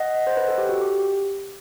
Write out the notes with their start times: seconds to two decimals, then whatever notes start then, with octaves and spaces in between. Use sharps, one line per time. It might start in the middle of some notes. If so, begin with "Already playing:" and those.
Already playing: D#5 F#5
0.27 C5
0.37 B4
0.48 A4
0.58 G4
0.69 F#4
0.81 G4